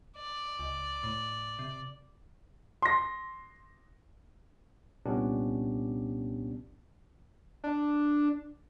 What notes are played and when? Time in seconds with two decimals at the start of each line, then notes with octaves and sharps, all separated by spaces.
0.17 D5
0.59 C#2
1.03 A2
1.59 C3
2.82 C6 A#6
5.06 C2 A#2 B3 C#4 D4 G4
7.64 D4